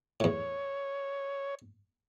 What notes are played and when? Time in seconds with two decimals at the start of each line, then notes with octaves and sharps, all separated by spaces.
0.20 E2 A2 C#5